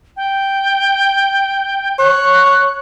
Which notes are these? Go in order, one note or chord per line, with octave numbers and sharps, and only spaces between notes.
G5
C#5 F#6